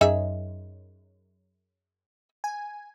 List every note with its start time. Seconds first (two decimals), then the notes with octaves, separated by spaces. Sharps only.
0.01 F#2 D#4 G#4 E5
2.44 G#5